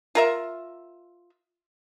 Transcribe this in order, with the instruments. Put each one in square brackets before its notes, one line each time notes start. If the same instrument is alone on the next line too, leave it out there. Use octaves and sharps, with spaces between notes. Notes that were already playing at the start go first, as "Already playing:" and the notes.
[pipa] F4 A#4 E5